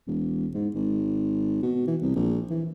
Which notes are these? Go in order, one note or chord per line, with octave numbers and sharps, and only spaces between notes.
E1
G#2
G#1
B2
E3
C2
A#1
E3